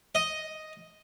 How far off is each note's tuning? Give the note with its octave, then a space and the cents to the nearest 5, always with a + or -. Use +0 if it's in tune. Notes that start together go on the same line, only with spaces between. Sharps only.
D#5 +0